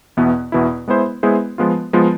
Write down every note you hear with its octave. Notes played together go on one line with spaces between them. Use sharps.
E2 B2 B3 E4
E2 B2 B3 E4
G#3 B3 E4 G#4 C5
G#3 B3 E4 G#4 C5
F3 G#3 B3 F4
F3 G#3 B3 F4